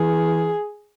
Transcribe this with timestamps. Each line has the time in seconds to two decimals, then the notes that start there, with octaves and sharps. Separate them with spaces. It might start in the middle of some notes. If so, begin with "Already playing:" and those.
Already playing: E3 G#4